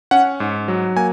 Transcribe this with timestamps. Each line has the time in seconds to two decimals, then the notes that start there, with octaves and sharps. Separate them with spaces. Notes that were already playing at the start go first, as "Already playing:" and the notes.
0.11 C#4 F#5
0.40 G#2
0.68 F#3
0.96 A#3 G#5